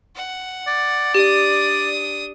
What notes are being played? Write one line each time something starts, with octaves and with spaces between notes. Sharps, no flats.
F#5
D5
D4 G4 D#6